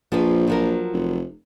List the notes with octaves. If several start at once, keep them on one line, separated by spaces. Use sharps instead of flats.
A#1 F3 G#4 B4
F3 F#3 A#4
F1